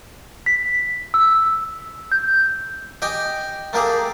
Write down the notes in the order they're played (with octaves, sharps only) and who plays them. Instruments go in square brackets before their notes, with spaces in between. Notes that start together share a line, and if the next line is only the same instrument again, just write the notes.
[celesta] B6
E6
G6
[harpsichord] G4 D#5 G5 G#5
A3 A#3 G4 G#4